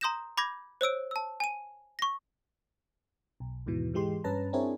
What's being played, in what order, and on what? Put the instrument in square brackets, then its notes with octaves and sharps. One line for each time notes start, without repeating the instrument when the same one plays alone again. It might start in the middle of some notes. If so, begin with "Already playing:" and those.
[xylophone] A#5 C6 D#6 G6 A#6 E7
B5 D6 G6 G#6 A#6
C5 C#5 E6 D7
A5 E6
G#5 D#7
C#6 A#6
[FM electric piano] B1
D#2 G#2 B2 E3
G#2 E3 G#3 G4 C6
G2 C#4 B4 A5 A#5
C4 D4 E4 G#4 A#4 C#5